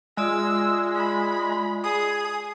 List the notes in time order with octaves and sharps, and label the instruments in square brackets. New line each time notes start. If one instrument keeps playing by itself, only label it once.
[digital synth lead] G#3 [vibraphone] F4 D5 E5 [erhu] E6
[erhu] B5
[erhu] G#4 [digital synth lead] D#6